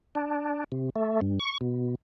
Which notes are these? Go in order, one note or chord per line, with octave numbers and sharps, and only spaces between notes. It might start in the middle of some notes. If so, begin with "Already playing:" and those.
D4
C3
A3
G2
C#6
B2